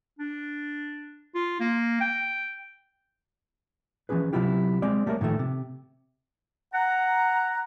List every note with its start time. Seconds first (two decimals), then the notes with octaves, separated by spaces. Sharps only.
0.19 D4
1.35 F4
1.60 A#3
2.01 G5
4.09 E3 F3 C#4 G#4 B4
4.33 C3 E3 F#3 E4 F4 G4
4.82 G#3 C4 D5
5.06 G3 A3 A#3 A4 A#4 C#5
5.21 A2 D#3 F3 A3
5.39 C3
6.74 F#5 A#5